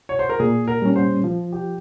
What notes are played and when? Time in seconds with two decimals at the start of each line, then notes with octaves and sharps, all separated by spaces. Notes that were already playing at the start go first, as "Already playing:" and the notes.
0.09 C#5
0.19 C5
0.29 A#4
0.39 A#2 G#4
0.68 A#4
0.82 G3 C#4
0.96 C5
1.24 F3
1.52 G4